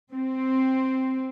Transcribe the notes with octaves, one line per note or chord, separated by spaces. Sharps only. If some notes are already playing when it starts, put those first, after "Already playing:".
C4